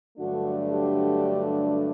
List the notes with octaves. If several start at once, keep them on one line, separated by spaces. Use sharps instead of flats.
G2 D3 F#3 A3 D4 F#4
G4